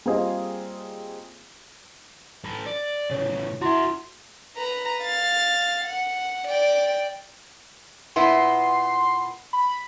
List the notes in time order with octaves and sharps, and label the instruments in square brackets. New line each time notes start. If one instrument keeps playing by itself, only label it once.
[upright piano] G3 A#3 C4 F4 G#4 D#5
[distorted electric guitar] A4 B4
D5
[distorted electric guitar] A2 C#3 [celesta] C#5
[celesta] E4 C6 [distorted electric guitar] F#4 E5
[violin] B4 A#5
F5 A6
F#5
D5 G5
[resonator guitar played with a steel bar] A#2 B3 E4 [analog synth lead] C6
[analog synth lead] B5